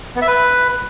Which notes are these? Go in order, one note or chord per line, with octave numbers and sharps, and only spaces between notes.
B3
E5
B4